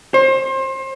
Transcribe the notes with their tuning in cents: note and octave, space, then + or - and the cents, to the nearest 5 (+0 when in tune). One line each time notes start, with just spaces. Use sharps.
C5 +30